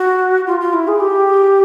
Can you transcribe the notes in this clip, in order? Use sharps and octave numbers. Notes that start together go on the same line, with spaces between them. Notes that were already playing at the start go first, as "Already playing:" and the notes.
Already playing: F#4
F4
F4
E4
G#4
G4